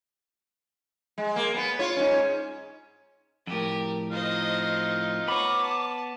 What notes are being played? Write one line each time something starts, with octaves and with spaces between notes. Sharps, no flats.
G#3
A#3
B3 B4
F4 C#5
G#2 C#4
F2 A2 G4 A#4
D#4 F4 C5 D#5
B3 C#5 A#5 B5 D6
A5